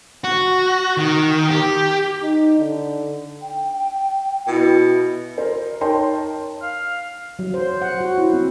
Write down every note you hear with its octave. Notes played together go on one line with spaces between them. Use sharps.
F#4
D#3
G4
D#4
D3
G5
B2 E4
A#4 C5
D#4 A#4 C#5 G5 A5 C6
F5
F#3
C5
F#5
F#4
E4
C4